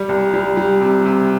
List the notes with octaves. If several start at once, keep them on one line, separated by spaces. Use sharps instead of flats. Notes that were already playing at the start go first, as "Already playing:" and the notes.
Already playing: G3
C2
G3
G3
C3
C3